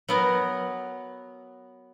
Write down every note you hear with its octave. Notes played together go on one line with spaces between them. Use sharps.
F#3 B3 A#4